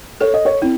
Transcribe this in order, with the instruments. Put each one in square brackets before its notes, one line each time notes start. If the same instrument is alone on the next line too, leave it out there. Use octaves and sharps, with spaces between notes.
[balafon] A4 [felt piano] C#5
[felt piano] D#5
C#5
[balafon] C4 [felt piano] E4